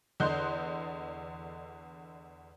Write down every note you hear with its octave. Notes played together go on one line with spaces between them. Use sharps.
E2 D3 D#5 C6 F#6 G6